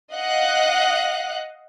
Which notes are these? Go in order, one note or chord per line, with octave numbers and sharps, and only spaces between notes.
D#5 F5 F#5 F#6